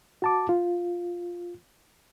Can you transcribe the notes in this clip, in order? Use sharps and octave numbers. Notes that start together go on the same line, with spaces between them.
F#4 A5 D6
F4